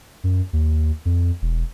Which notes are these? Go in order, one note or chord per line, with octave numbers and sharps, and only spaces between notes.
F#2
D#2
F2
E1